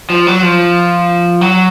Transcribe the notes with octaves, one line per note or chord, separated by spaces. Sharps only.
F3
F#3
F3
F#3